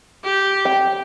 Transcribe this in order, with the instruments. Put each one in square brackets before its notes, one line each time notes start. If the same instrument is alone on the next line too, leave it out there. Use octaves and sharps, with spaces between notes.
[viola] G4
[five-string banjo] G5